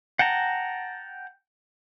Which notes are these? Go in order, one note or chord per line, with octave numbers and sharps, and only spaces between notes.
F#5 G5 A5 A#5